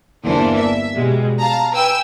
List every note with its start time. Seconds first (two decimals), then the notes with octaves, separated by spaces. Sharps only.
0.25 G1 E2 E3 A#3 D4 C5
0.57 E5
0.94 B2 G3 G#3
1.40 F5 A5 A#5
1.73 B4 G5 G#5 E6